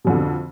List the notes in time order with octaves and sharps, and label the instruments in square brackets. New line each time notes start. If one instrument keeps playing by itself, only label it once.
[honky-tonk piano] B2
F2
D3